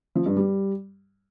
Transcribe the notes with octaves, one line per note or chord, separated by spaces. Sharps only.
F3
G2
G3